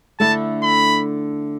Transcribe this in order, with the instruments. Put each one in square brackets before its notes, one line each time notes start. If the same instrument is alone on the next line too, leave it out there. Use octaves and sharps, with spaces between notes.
[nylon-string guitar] D3 A3 E4 [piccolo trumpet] A5
[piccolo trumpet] B5